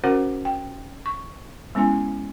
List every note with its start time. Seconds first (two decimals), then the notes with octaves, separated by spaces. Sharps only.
0.04 C#4 F#4 A#4 C5 F#5
0.45 G5
1.06 C#6
1.75 G#3 B3 C#4 E4 G#5